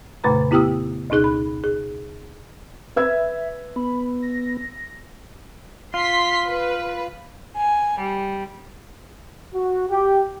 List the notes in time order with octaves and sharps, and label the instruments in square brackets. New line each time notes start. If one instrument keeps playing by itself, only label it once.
[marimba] F2 A#2 C#3 A3 B4 A#5
B3 E4 G4 G5 D#6 E6
D2 B2 D#4 G#4 F#6
B5
G#4
[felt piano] B4 E6 G#6 [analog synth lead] E5
[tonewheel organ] B3 [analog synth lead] B5
[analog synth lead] A#6
[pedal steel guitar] F4 [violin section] C6 B6
[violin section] B4
[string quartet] G#5
G3
[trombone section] F#4
G4